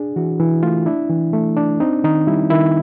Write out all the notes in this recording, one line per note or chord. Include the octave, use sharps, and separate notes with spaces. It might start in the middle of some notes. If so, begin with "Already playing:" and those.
Already playing: D4 G#4
E3 F#4
E3 E4
A3 F4
D4 E4
E3
A3
D4
C4 D#4
D#3 D#4
G3 E4
D#3 E4